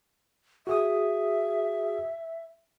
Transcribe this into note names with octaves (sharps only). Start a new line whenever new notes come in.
F#4 G#4 E5 D#6